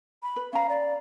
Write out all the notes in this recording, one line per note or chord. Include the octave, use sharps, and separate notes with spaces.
B5
B4
C#4 F5 A#5
D5